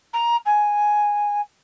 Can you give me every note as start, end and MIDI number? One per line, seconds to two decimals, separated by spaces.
0.13 0.36 82
0.46 1.41 80